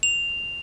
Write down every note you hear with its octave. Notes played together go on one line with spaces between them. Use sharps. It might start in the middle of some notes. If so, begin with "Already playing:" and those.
F7